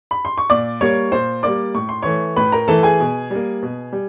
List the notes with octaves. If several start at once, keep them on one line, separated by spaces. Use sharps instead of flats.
B5
C6
C#6
A#2 D5 D6
G3 A#3 C#5 C#6
A#2 C5 C6
G3 A#3 D5 D6
A2 C#6
C6
E3 A3 C#5 C#6
A2 B4 B5
A#4 A#5
E3 A3 A4 A5
G#4 G#5
B2
G3 A#3
B2
G3